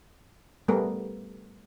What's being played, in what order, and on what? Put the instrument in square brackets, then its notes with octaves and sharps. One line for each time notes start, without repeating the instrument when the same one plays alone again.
[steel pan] G3 A3 B3 A#4